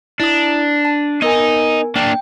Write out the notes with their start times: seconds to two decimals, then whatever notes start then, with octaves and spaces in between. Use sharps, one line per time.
0.20 D4 E4 D#6
0.85 A5
1.22 B3 D#4 A#4 D#5 G#5
1.96 A#3 D4 G5